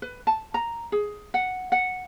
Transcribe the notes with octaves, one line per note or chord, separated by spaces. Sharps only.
B4
A5
A#5
G#4
F#5
F#5